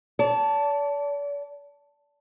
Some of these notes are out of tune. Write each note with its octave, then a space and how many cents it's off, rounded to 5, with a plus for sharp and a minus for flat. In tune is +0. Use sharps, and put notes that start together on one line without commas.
D5 -45 A5 +0